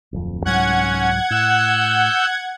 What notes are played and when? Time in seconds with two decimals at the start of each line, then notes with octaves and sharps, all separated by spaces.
0.12 D1 F2
0.45 C2 G#2 F#3 C#4 F#5 G#6
1.30 A2 E6 F#6 G6